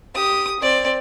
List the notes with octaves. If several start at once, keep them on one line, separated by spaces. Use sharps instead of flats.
G4 D#6
C4 D5